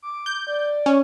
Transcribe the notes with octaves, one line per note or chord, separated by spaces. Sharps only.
D6
G6
D5
C#4